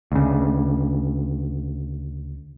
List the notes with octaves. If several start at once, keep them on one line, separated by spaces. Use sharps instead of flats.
D2 C#3